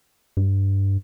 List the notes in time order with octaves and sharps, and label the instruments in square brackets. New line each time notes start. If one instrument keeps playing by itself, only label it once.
[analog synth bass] G2